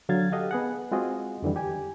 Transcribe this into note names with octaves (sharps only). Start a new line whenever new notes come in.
D3 F#3 F5 G#6 A6
G4 A4 D#5 F5 F#5
B3 G#4 F#5
G#3 C4 F4 F#4 G#4 D#5
F2 D3 E3 G3
G4 G#5